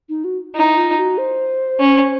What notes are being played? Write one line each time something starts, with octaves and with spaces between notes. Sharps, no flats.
D#4
F#4
D#4 E4
F4
F#4
C5
C#4